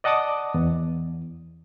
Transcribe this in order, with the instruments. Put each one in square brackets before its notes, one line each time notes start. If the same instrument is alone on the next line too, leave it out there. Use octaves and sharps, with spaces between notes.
[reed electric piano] D5 D#5 F#5 A5 D6 D#6
E2